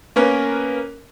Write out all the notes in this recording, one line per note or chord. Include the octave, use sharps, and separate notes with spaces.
A#3 B3 C#4 A#4